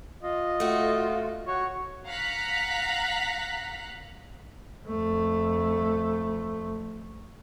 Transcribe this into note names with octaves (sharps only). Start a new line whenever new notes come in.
F4 D#5
A3 F#4
F#4 C#5
F5 F#5 A#5 F#6 B6
F2 A3